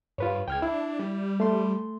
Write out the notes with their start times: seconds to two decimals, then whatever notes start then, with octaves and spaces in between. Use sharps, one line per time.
0.18 G2 F4 B4 C#5
0.48 C#2 G5 F6 G#6
0.62 D4 E4
0.99 G3
1.40 A3 C6